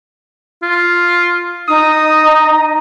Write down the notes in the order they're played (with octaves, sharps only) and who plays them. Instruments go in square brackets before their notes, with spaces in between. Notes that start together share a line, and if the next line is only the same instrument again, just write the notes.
[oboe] F4
[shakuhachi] D#4 [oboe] D#6